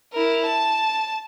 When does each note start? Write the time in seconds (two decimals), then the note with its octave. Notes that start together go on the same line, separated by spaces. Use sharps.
0.13 E4 A#4
0.46 A5